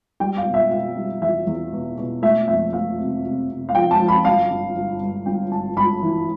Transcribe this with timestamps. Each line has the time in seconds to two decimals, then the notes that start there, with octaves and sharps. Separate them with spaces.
0.20 G3 G5
0.37 F5
0.45 B2
0.54 E5
0.70 B2 F5
0.97 G3
1.22 E2 E5
1.47 E2
1.72 B2
1.97 B2
2.22 A3 E5
2.48 F2 E5
2.73 A3 F5
2.99 C3
3.24 C3
3.49 C3
3.69 F5
3.75 F3 G5
3.91 A5
4.00 F3
4.08 B5
4.25 G1 F5
4.50 G1
4.76 G1
5.01 G2
5.26 G1 G5
5.51 G1 A5
5.76 G1 B5
6.02 E3